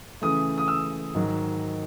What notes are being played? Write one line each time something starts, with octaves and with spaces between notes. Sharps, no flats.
C#3 E3 A3 D#6
D#6
E6
G#2 D#3 F#3